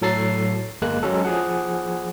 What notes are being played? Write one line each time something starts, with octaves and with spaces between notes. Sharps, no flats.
A2 F#3 A4 A6 C7
G1 G#3 A#3 F#6
F#3 G#3 C#4 F#4 A4
F3 G#4 F#5